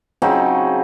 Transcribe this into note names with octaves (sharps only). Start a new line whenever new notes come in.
C#3 F#3 C4 D#4